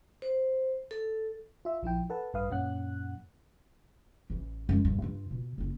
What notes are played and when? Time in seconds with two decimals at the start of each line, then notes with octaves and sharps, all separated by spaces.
0.22 C5
0.91 A4
1.65 F4 E5
1.82 A#1 F3 E4 G5
2.10 A4 B4 F#5 A5
2.34 A1 G2 B4 F5 D#6
2.50 F#2 A#2 C#4 F#5 F#6
4.30 A1 E3
4.69 F#2 G#3
4.85 G2 A#2
5.02 G2 F4
5.31 B2
5.58 F#1 E4